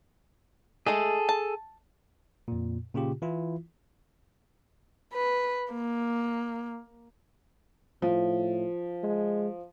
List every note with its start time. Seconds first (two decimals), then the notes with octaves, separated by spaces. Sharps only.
0.86 G#3 A3 G#4 A4
1.29 A5
2.48 F2 A#2
2.94 A#2 C#3 F4 G4
3.22 E3 E4 F4
5.13 B4
5.73 A#3
8.02 A2 F3
9.03 G#3